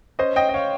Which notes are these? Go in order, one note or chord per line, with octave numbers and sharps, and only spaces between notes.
C#4 C5 D#5
D#5 G5
D#5
C#5 F5